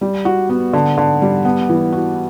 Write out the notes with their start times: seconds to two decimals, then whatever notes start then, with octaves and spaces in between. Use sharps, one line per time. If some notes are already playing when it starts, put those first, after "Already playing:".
0.01 G3
0.25 F#4
0.49 B3
0.73 D3
0.98 D3
1.22 G3
1.45 B3
1.69 E3
1.93 F#4